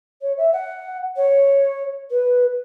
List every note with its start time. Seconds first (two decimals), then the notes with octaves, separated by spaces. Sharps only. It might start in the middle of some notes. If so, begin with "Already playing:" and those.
0.22 C#5
0.37 E5
0.53 F#5
1.16 C#5
2.11 B4